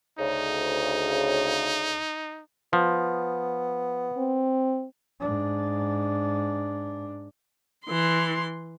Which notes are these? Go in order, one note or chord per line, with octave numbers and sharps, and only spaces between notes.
D2 C#3 D#4
F3 B3
C4
G#2 D4
E3 C6